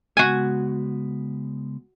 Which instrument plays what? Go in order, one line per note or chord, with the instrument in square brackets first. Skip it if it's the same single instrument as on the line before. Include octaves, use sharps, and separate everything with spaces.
[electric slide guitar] C#3 G#3 B3 [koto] F#4 G#5